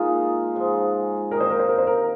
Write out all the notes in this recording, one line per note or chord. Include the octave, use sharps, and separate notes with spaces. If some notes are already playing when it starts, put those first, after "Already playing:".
Already playing: A#2 G#3 D#4 F4
G#2 F3 G#3
C3 D#3 A#3 D#4 A#4
C5
A#4
C5
A#4
C5
A#4